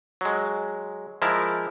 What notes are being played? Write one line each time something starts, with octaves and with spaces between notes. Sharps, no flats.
F#3 G#3
F3 G#3 E4 A#4